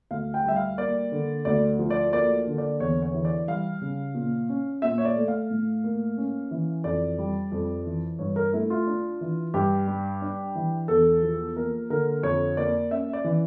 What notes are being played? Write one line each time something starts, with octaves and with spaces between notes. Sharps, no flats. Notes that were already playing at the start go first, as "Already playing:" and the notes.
D2 F5
G5
G3 E5
F5
A#3 D5
D3
D2 D5
F3
D5
A#3 D5
D3
D5
E2 C#5
C#5
E3
D5
G3 F5
C#3
A#2
C#4
A#2 E5
C#5
D5
A3
F5
A2
A#3
C#4
E3
F2 D5
G3
F2
E3
G2 C#5
A#4
A3 E4
F4
D4
E3
G2 G4
G3
D4
E3
E2 A4
F3
A#3 A#4
D3 A#4
F2 C#5
A#3 D5
C#4 E5
D5
E3